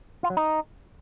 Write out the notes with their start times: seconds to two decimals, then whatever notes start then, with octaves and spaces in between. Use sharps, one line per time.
0.23 F4
0.30 F#3
0.37 D#4